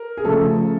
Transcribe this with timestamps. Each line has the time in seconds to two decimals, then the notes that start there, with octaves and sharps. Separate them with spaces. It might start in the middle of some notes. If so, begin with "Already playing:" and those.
Already playing: A#4
0.17 G#4
0.24 C#3 F3 A3 A4